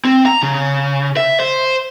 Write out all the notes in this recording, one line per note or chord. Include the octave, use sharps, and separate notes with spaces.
C4
A#5
C#3
E5
C5